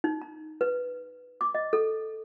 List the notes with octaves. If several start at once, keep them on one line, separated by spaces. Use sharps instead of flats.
D#4
A#5
B4
D6
D#5
A4